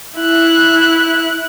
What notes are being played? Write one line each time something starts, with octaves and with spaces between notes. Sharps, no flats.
E4 F#6